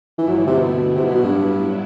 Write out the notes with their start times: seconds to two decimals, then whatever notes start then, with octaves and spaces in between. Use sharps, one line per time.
0.18 G2 D3 E3 A3 E4
0.28 F#3
0.37 E3
0.47 C3
0.58 B2
0.96 A2 C3 F#3 B3 E4
1.05 B2
1.15 B2
1.24 G2